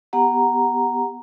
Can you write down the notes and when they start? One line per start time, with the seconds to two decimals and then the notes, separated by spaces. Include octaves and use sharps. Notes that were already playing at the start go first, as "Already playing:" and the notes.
0.13 B3 G4 F#5 A#5